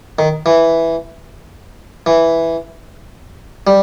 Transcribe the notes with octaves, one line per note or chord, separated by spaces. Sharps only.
D#3
E3
E3
G3